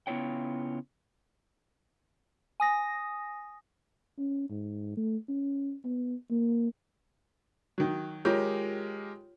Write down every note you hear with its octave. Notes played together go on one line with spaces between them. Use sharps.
C#3 B3 E4 F4 C#5 G5
G#5 D#6 A#6
C#4
G#2
A3
C#4
B3
A#3
D#3 F#3
G#3 F4 G4 A#4 C#5